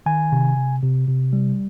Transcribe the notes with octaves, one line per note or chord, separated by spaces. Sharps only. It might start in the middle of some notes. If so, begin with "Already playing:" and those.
D#3 G#5
C3
C3
C3
C3
G3